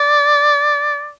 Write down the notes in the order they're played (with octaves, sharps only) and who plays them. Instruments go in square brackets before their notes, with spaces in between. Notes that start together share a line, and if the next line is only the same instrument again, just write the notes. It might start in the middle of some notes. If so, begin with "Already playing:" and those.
Already playing: [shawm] D5